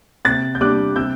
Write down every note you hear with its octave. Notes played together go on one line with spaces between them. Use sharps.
C3 F#6 A6
G6
G3 D4 D6 F#6
C3 E6 G6